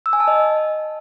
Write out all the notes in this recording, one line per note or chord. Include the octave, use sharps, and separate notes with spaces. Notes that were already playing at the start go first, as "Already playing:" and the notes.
E6
G#5
A5
D#5